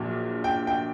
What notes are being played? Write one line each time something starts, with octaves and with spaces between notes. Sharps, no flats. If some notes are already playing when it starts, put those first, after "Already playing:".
Already playing: A#1 A#2 F#3
G5
G5